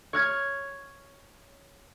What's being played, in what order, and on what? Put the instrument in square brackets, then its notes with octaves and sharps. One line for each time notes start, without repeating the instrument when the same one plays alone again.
[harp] C#5 F6 G#6